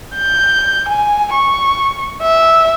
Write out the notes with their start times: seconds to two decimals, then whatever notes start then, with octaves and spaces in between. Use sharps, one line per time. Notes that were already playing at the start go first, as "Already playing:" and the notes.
0.15 G6
0.89 G#5
1.34 C#6
2.22 E5